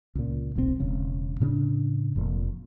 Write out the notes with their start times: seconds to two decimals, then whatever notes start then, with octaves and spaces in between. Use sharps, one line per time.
0.15 C#2 A#2
0.55 D#1 B1 B2 C4
0.80 E1 C#3
1.40 A2 C#3 C4 D4
2.16 F1 F2 A#2